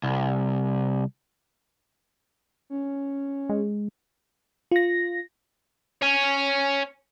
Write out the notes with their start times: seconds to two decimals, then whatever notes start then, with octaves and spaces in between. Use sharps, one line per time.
0.04 C2
2.70 C#4
3.49 G#3
4.71 F4 A#6
6.02 C#5 G#5